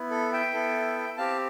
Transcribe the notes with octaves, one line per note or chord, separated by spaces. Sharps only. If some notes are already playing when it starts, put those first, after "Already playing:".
Already playing: B3 E4
A4
E5 G5
B3 E4 A4
C4 G4 F5 A5